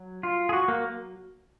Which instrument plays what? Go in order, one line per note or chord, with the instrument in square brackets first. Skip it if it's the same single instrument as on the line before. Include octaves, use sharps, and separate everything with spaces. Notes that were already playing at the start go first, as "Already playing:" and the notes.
Already playing: [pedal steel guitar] F#3
F4
G#4
F#4
A#3